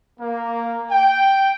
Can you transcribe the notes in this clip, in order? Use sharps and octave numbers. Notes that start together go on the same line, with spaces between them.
A#3
G5